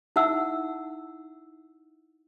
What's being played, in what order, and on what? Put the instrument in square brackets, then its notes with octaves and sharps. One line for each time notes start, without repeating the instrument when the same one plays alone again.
[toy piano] D#4 E4 E5 F#5 E6